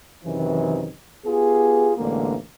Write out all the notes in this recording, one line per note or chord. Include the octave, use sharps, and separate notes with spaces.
F#2 C3 D#3 E3
B3 F4 G4 G#4
A1 D2 D3 G#3 A#3